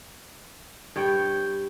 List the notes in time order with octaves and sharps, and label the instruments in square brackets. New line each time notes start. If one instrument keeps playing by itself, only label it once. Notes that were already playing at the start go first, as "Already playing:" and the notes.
[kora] G2 C#5 G5